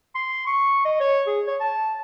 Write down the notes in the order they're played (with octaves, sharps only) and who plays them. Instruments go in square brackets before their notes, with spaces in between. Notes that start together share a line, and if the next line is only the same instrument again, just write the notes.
[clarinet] C6
C#6
D#5
C#5
G#4
C#5
A5